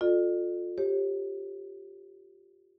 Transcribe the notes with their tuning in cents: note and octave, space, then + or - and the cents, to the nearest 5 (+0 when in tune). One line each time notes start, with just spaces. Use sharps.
F4 +25 A4 +0 D5 +45
G4 +0 C#5 -40